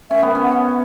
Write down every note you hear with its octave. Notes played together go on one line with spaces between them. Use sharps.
C#4 E5
B3
C#4
F#5